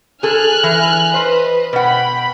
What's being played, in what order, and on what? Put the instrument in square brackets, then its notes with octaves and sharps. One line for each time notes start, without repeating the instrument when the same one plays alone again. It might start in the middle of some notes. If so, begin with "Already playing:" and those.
[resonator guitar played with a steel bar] G#4 A4 [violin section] G#5 F6 F#6
[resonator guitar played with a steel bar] E3
[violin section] B4 D#5 [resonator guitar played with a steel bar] C5
[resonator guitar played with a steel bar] B2 F#5 [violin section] G5 B5